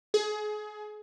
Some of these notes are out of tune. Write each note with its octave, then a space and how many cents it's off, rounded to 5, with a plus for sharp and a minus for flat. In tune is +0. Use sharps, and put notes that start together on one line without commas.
G#4 +25